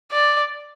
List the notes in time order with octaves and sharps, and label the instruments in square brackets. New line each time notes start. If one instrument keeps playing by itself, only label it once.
[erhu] D5